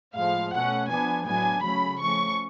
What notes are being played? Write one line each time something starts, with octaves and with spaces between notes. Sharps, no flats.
A2 F3 G#3 F5
B2 A3 C#4 F#5
F3 B3 D4 G#5
A2 F#3 B3 D4 G#5
C#3 F#3 A3 C#4 B5
F3 A3 C#4 C#6